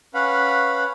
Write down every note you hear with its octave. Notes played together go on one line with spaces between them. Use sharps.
C#4 B4 F5 F#5 B5